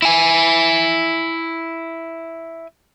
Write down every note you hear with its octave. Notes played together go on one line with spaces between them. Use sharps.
E4 G#5